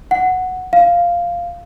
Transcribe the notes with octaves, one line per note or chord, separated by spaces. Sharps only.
F#5
F5